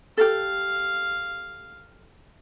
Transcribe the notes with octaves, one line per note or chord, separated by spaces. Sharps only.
G4 A4 F5